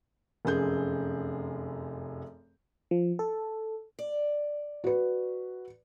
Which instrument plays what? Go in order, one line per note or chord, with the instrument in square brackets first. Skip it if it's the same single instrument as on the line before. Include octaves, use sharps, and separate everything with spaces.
[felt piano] F1 F#2 G#4 G6
[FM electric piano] F3
A4
[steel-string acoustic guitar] D5
[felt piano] F#4 B4